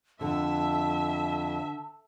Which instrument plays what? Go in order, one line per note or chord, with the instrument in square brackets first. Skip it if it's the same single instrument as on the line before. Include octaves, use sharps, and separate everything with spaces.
[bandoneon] F2 [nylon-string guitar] D3 [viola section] E5 [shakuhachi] A5